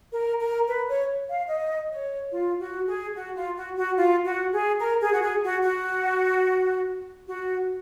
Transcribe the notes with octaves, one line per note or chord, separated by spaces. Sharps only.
A#4
A#4
B4
C#5
F5
D#5
C#5
F4
F#4
G#4
F#4
F4
F#4
F#4
F4
F#4
G#4
A#4
G#4
F#4
G#4
F#4
F#4
F#4